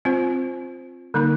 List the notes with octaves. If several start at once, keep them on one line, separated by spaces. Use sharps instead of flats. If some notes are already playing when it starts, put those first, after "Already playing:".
C4 F4 C5
D3 G3 A#3 D#4 A#4